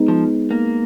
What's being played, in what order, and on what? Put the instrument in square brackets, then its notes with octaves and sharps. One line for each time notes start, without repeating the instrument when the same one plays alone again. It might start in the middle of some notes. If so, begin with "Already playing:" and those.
Already playing: [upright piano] G#3 B3 D#4
[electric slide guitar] F3
A#3